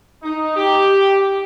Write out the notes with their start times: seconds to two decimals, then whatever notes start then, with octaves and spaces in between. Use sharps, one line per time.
0.23 D#4
0.56 G4